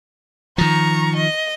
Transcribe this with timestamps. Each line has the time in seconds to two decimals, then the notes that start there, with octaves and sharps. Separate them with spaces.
0.58 D#3 F3 A#5 C#6
1.16 D#5